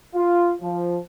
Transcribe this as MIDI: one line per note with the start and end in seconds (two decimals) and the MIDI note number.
0.15 0.53 65
0.61 0.97 53